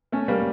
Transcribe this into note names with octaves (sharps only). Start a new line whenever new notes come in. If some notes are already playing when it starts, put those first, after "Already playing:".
A3 C#4
G3 A#3